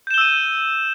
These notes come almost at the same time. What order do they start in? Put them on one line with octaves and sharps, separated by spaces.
G6 E7 G7 E6 D#7